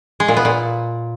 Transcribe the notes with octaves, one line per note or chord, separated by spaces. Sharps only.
G#3
A#2
B3
A#2